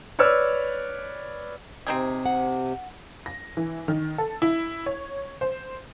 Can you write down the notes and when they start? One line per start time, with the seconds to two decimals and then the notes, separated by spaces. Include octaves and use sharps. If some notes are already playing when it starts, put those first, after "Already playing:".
0.19 B4 C#5 D5 E6 F6
1.87 C3 C4 D#4 G#4
2.26 F#5
3.26 A#6
3.57 E3
3.88 D#3
4.18 A4
4.42 E4
4.86 C#5
5.41 C5